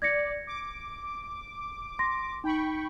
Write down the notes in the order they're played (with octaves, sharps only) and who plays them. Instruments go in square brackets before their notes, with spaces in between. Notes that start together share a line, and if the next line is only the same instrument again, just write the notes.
[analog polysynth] D5 [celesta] G#6 A#6 C#7
[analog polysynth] D6
[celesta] C6 A#6
[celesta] D#4 [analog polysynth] G5 B5 C#6